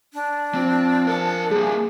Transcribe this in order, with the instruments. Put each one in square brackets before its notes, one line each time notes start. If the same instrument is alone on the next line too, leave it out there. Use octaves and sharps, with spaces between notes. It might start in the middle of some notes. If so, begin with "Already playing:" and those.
[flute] D4
[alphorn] F3 [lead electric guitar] C4
[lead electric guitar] A#4 A5
[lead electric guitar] G3 A#3 [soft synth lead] G#4